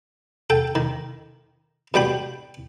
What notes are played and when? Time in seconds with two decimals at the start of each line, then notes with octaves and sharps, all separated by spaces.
0.50 A4 G5
0.75 D#3
1.94 B2 G3 G5 B5